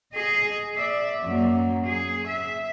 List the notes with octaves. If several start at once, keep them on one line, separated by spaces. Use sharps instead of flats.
G#4 D#5
D5 E5
F#2 A#3
G#4
E5